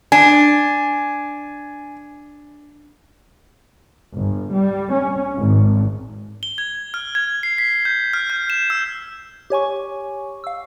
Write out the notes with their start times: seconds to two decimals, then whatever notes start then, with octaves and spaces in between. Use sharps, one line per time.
0.12 D4 G#5
4.14 G1
4.52 G3
4.91 C#4
5.36 G#1
6.43 G7
6.58 G#6
6.94 F6
7.15 G#6
7.43 C7
7.58 B6
7.85 G6
8.13 F6
8.30 G6
8.50 E7
8.70 E6
9.50 G4 C#5 G#5 C#6
10.44 F5 E6